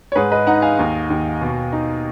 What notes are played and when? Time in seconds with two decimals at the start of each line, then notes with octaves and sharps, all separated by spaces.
0.12 C#5
0.15 G#2 G#4 B4
0.32 B4 D#5
0.47 D#4 F#5 A#5
0.62 F5 G#5
0.79 D#2
1.10 D#2
1.41 B2
1.73 D#4